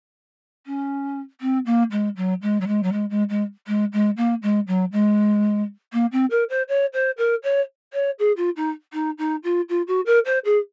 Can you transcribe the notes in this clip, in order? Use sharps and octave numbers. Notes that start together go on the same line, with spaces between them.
C#4
C4
A#3
G#3
F#3
G#3
F#3
G#3
F#3
G#3
G#3
G#3
G#3
G#3
A#3
G#3
F#3
G#3
A#3
C4
A#4
C5
C#5
C5
A#4
C#5
C#5
G#4
F4
D#4
D#4
D#4
F4
F4
F#4
A#4
C5
G#4